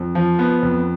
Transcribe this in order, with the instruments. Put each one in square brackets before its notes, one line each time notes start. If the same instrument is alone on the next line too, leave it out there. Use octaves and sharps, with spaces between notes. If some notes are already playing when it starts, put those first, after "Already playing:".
Already playing: [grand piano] F2
F3
B3
F2